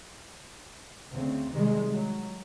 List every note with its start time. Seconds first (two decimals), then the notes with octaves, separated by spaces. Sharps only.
1.11 D2 C#3 C4
1.51 C3 D#3 G3 G#3
1.90 F#3